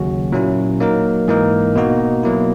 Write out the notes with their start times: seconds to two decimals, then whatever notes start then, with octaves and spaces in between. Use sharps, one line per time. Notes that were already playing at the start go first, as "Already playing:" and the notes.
Already playing: D#2 C#3 F#3 C#4 F#4
0.32 A#2 F#3 A#3 C#4 E4
0.80 F#3 A#3 D#4 A#4
1.28 G#2 E3 A#3 D#4 A#4
1.75 B2 A#3 D#4 F#4
2.23 B2 F#3 A#3 E4